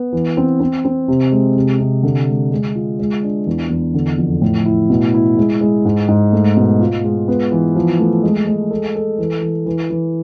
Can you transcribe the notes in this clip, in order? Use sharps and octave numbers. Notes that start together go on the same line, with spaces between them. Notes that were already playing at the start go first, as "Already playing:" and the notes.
Already playing: B3
E3
C4
C4
C4
C3
G#3
C3
C3
D3
G#3
G#3
F4
G#3
D4
E2
E2
D3
F2
A2
E4
B2
E4
G#3
G#3
G#2
G#2
A3
B2
F4
G#3
B3
E3
F3
A3
G#3
G#3
A4
A4
E3
E3
E3
E3